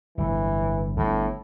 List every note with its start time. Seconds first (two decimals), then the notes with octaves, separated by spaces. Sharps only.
0.18 G1 A2 E3
0.97 G1 A2